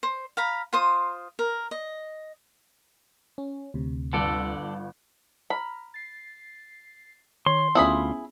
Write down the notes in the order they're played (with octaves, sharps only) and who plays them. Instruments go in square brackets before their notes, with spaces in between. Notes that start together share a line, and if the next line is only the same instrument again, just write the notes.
[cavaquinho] C5
F5 A#5 B5
F4 C5 D#6
A#4
D#5
[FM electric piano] C#4
D2 C3
[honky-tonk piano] G1 [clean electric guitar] D3 A4 D5
[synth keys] A#5 F6 [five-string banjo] B5
[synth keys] A6 C7
[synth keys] D#3 [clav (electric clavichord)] C#5 [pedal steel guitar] C6
[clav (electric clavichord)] D2 F4 [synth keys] B3 C#4 [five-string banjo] E4 G#4 B5